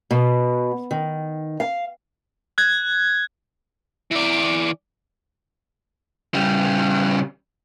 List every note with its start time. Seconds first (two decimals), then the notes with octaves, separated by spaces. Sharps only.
0.11 B2
0.91 D#3
1.60 F5
2.58 F#6 G#6
4.11 E3 D5
6.34 C#3 G3